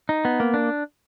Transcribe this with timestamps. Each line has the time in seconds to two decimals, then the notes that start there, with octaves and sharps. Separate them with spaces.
0.09 D#4
0.25 B3
0.40 A#3
0.54 D4